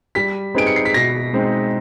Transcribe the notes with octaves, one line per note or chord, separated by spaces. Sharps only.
G3 B6
C4 D#4 G#4 B4 D7
C#7
C7
B6
B2 A#6
G#3 C4 D#4